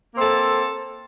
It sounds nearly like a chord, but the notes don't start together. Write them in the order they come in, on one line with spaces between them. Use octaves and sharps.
A#3 C4 A4